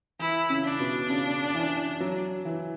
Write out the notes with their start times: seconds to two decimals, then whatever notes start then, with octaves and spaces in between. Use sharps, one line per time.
0.19 E3 E4
0.50 C#3
0.65 D4
0.80 B2
1.09 C#3
1.55 E3
2.00 F#3
2.45 E3